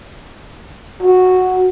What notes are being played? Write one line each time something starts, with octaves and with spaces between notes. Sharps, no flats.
F#4